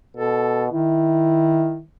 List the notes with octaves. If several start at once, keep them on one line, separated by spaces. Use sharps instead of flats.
B2 A4
D#3 E4